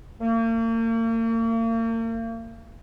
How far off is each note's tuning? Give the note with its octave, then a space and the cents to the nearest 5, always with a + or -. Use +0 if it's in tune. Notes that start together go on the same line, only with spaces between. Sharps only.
A#3 -40